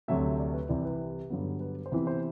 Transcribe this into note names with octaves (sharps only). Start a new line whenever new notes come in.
D2 C3 F#3 A3 E5
D5
B4
C2 C3 E3 D5
B4
G2 D3 F#3 B3
B4
C5
C3 E3 B3 B4
C5